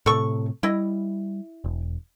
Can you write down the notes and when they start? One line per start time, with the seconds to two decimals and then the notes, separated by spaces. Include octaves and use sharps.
0.06 A2 C3 A4 C#6
0.63 G3 E4 D#5
1.64 E1